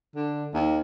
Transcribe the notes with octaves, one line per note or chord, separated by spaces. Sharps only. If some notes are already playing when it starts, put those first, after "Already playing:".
D3
D#2